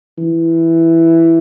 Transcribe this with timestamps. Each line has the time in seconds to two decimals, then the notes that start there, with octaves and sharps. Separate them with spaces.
0.18 E3